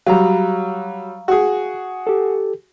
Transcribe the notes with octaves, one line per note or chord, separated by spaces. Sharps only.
F#3 G3 F5 A#5
F#4 G#4
G4 A4